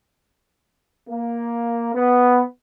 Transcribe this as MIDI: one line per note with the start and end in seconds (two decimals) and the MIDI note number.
1.08 1.91 58
1.94 2.42 59